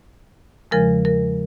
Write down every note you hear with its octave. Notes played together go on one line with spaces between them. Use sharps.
E2 C#3 F3 G#3 A#4
A#4